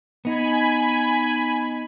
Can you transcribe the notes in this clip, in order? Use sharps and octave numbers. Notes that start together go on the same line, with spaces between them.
B3 D#4 G#5 B5